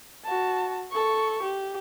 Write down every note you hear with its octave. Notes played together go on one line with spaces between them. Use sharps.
F#4 A5
A4 C#6
G4